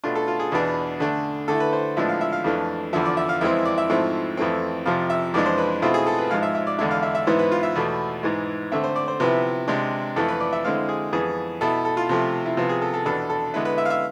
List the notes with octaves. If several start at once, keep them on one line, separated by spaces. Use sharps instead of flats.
B2 A3 D4 F4
A4
F4
G#4
E2 B2 B3 D4
D3 A3 D4
D3 A3 E4 A4
B4
C5
A2 F3 G#3 B3 D4 E5
F5
E5
F5
F2 E3 A3 D4
E2 D3 F3 E5
D5
E5
F5
F2 E3 G#3 C4 E4 E5
D5
E5
G#2 F3 A3 C4 E4
F2 E3 A3 C4
F2 C3 F3 F5
E5
F2 E3 G#3 D4 D5
C5
B4
B2 A3 C4 E4 F4
G#4
A4
B4
G#2 F3 G#3 F5
E5
E5
D5
E2 D3 G#3 D4 E5
F5
E5
E5
G#2 E3 B3 E4 C5
B4
F4
E5
E2 B2 A3
G#2 E3 G#3
D3 A3 C4 E5
C5
D5
C5
C3 F3 B3 E4 B4
C3 G#3 D4
F2 E3 A3 A4
B4
D5
E5
D3 G#3 C4 E4 F5
G#4
F2 E3 B3 G#4
B2 B3 E4 A4
A4
F4
C3 F3 A3
E4
C3 F3 B3 F4
G#4
A4
A4
E2 B2 B3 D4 A4
A4
D3 G#3 B3 E4 B4
B4
E5
F5
E5